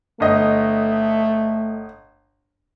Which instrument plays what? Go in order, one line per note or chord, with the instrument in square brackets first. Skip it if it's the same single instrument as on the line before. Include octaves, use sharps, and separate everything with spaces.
[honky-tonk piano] G1 D#5 [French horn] A3